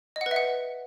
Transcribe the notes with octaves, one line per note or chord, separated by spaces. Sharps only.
D#5
F#5
B4
E5
F#5